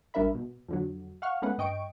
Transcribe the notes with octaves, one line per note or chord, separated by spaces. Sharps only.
A1 G3 D4 A#4 E5 B5
B2
F2 D3 F#3
F5 F#5 C#6 F6
G#3 A3 B3 C#4 B4 F#5
G2 D#5 G5 C#6 D7